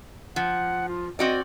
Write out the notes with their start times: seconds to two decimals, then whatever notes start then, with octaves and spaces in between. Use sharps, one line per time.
0.36 F3 F#5
0.88 F4
1.19 C4 F#4 D5 D#5